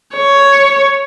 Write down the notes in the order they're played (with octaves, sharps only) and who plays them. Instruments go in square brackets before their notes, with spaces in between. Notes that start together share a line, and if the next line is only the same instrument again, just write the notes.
[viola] C#5